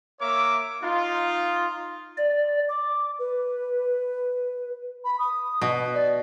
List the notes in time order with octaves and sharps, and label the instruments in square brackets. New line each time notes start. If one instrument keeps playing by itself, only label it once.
[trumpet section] A#3 A#4 C#5 E5 D6
D#4 F4
[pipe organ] D5
[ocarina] D6
B4
[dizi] B5
D#6
[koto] B2
[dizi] D5